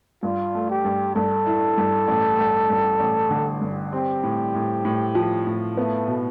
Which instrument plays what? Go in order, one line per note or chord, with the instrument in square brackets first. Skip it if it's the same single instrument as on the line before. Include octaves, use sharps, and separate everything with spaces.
[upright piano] G2 [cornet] F4
[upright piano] A3
[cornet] G4
[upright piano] G2
[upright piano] G2 [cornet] A4
[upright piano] E4
G2
A1
G2
G2
A1
D3
G2
[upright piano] C4 [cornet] G4
[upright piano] A2
A2
A2
F3
A2
[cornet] A3 [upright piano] B3
[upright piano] B2